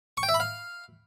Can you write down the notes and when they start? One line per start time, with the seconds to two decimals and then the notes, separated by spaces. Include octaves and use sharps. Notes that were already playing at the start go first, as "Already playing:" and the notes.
0.17 C#6
0.23 G5
0.29 E5
0.34 B5
0.40 F5